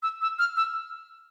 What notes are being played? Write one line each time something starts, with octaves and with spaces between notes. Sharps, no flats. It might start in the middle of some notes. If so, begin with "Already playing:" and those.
E6
E6
F6
E6